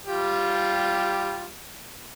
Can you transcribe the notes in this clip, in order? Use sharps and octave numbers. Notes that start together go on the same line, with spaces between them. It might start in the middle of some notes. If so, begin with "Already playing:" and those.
G3 F4 G4